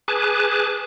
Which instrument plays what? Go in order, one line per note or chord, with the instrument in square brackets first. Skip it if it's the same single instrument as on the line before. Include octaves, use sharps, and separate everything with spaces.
[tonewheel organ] G#4 B4 G#5 A5 D6 F#6